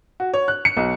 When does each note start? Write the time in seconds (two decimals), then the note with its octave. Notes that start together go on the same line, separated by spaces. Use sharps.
0.20 F#4
0.34 C#5
0.48 F#6
0.65 C#7
0.77 B1